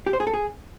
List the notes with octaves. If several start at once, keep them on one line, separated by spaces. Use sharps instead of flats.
G4
C5
G#4
A4
G#4